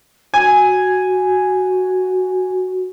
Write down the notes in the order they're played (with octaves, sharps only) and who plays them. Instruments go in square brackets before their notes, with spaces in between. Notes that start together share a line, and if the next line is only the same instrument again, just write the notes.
[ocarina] F#4 [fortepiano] G#5